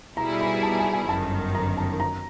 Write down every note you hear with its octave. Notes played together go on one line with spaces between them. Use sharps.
B2 G3 B3 E4 G#4 A#5
B5
A5
G#5
G#5
G1 F#2 D#3 A5
A#5
A5
A#5